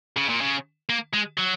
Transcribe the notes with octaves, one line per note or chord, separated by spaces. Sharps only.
C#3
A#2
C#3
A#3
G#3
F#3